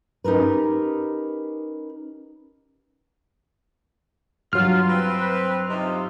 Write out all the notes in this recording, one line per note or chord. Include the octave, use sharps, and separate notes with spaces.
C#4 D#4 G4 A#4 B4
G2 F#3 F4 F6
C4 B4
C3 D#4 F4